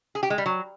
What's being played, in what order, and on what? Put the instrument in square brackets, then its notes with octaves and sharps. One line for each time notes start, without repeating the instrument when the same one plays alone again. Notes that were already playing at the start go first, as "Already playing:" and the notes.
[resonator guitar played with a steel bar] G#4
G4
G#3
G3
F#3